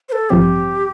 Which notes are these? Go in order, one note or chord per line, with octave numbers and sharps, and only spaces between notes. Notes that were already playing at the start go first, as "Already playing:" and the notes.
C5
A4
A1 G2 F3 C4 G4